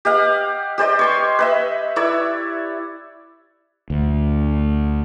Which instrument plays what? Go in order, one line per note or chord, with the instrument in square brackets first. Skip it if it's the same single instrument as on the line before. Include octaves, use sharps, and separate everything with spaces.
[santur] G4 D#5 F5 F#5
G4 C5 D5 D#5
C#5 C6 C#6
B4 D#5 E5
E4 C#5 D5 E6
[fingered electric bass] D2